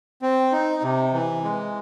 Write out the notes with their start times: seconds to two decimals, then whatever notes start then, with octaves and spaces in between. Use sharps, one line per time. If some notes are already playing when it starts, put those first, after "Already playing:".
0.22 C4
0.52 D#4
0.83 C3
1.13 E3
1.44 G#3